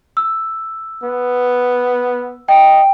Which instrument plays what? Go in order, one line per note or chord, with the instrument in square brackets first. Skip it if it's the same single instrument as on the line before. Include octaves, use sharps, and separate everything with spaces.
[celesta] E6
[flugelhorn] B3
[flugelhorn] D#5 [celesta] G5